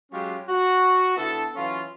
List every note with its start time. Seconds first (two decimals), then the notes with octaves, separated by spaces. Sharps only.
0.12 F#3 G#3 C#4 F4 G4
0.48 F#4
1.17 D3 B3 E4 A4
1.55 E3 F#3 C#4 F4